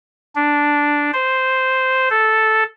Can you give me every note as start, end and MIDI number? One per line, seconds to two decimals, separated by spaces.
0.36 1.11 62
1.13 2.09 72
2.10 2.64 69